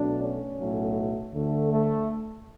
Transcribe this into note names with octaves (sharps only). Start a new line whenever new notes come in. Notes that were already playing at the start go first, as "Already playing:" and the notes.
Already playing: B1 B2 F#3 A3 D4
C#4
B1 A2 F#3 A3
D2 D3 A3
A3